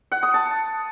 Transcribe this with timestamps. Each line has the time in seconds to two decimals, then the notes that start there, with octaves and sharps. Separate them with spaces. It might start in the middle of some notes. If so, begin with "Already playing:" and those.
0.12 F#5
0.23 D#6
0.34 A5